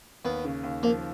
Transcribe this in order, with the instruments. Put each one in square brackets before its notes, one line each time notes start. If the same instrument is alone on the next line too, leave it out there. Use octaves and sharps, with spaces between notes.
[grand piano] D#2 [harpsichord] B3
[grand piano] C#3
D#2
[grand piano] F3 [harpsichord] A#3